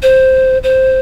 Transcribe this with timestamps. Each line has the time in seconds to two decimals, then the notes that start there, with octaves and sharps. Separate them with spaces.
0.03 C5
0.64 C5